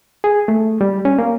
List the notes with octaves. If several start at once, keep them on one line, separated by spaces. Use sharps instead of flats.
G#4
A3
G3
C#4
A#3